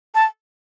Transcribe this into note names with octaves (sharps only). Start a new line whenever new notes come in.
A5